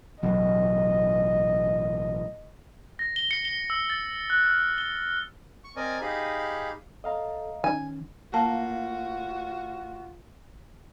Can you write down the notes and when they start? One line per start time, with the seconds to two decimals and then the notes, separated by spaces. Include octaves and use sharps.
0.23 A1 B2 F#3 D#5
2.99 A#6
3.16 G7
3.31 C#7
3.45 G7
3.70 E6
3.90 A6
4.30 F#6
4.46 F6
4.78 G7
5.64 C#6
5.76 C4 A#4 D5 D#5 G#5
6.02 D#4 G4 G#4 F5 B5
7.04 A4 D#5 F5 A#5
7.64 D#3 C#4 G#5
8.34 A2 A#3 F4 F#4 A5